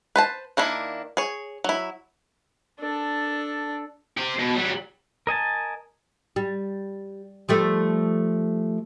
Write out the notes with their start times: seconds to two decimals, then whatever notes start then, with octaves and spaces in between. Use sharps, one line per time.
0.16 B4 C5 A5
0.57 D#3 A#3 D4 E4
1.17 G#4 C#5
1.64 F#3 E4
2.79 D4 A4
4.17 G4 C5
4.39 B2
4.55 F#3 G3
5.27 A#4 D#5 G#5 A5
6.36 G3
7.49 F3 G3 A3